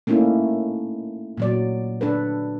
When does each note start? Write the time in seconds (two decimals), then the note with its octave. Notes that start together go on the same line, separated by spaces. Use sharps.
0.07 A3 A#3 C#4 D#4 E4
1.37 A#2 F#3 D5
2.01 D4 A4 B4